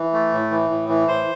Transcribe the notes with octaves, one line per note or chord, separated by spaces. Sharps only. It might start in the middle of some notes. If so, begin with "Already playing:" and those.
Already playing: E3
A3
A2
E3
A2
E3
A2 C5